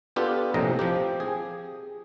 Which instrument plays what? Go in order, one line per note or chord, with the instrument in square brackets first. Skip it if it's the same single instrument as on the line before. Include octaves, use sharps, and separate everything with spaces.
[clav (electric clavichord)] B3 D4 F4 G4 A4 B4
A#1 A2 C3 D#5 A#5
F3 C4 G4
G#4